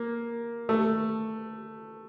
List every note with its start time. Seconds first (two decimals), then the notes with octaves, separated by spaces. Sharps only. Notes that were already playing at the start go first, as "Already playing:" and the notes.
Already playing: A#3
0.69 A3